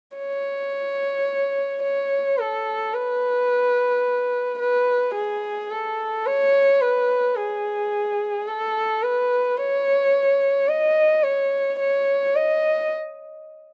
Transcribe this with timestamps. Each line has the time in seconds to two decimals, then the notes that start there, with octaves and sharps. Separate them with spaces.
0.17 C#5
1.83 C#5
2.38 A4
2.94 B4
4.60 B4
5.15 G#4
5.70 A4
6.26 C#5
6.82 B4
7.36 G#4
8.48 A4
9.03 B4
9.58 C#5
10.69 D#5
11.24 C#5
11.80 C#5
12.35 D#5